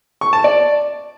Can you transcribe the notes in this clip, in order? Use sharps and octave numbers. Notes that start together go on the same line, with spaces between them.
C#6
A5
D5